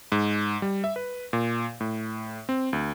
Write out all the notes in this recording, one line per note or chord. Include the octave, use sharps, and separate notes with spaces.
G#2
G3
E5
B4
A#2
A2
C4
D2